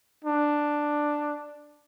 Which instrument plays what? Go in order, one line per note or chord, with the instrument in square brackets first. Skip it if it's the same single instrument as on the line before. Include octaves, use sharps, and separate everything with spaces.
[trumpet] D4